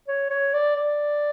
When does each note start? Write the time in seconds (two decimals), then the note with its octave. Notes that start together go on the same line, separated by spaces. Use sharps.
0.08 C#5
0.30 C#5
0.53 D5
0.76 D5